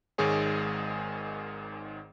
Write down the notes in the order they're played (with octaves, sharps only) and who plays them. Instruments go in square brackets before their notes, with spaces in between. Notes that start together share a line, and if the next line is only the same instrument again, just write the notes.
[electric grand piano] G#1 G#2 D#3 G#3 G#4 C#5